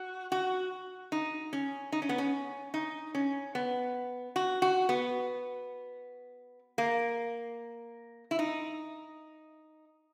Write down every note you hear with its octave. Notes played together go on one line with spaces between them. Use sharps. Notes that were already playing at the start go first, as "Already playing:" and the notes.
Already playing: F#4
F#4
D#4
C#4
D#4
C#4
B3
C#4
D#4
C#4
B3
F#4
F#4
B3
A#3
E4
D#4